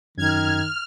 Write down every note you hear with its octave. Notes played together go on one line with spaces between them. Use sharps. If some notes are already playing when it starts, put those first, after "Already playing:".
F#2 D#3 F6 G#6